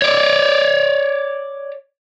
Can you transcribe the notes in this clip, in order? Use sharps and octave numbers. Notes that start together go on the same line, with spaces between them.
C#5 D5